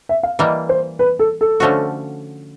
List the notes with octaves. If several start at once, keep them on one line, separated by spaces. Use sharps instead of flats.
E5
F5
E3 G3 A#3 D#5
C5
B4
A4
A4
D3 F3 A3 C#4 F#4